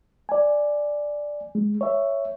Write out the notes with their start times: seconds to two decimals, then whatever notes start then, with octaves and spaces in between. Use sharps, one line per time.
0.29 D5 G#5
1.55 G#3
1.81 C#5 E5